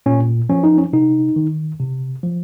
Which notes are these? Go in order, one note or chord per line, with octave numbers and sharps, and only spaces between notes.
A#2 C#4
F3 C#4
D#4
C#4
C3 D#4
D#3
C3
F3